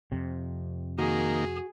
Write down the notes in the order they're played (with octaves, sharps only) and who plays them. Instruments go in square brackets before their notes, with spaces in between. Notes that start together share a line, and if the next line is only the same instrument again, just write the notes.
[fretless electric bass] F2 C3
[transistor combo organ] D#3 A#3 [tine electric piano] F#4 [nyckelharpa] G#4